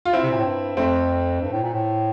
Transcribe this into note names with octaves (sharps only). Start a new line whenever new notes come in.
F4
C4 E4
C3
A#2
A2
G2
F2 A3 C4
G2
A2
A#2
A2